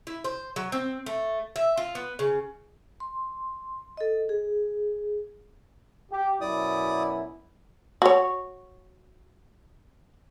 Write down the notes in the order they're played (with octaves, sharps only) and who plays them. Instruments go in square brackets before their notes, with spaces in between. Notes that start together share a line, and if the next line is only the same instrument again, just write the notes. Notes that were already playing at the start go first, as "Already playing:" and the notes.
[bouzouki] E4
C5
F#3
C4
A3
E5
F4
B3
C#3
[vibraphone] C6
A4 D#5
G#4
[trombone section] G4
[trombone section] F#2 B2 E4 [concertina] D5 D#6
[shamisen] F#4 C#5